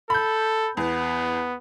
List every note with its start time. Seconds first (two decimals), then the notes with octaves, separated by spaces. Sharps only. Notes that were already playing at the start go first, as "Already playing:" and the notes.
0.10 A4 B5 G6
0.77 E2 B3